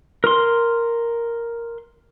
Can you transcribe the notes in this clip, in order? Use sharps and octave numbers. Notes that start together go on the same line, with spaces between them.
A#4 C6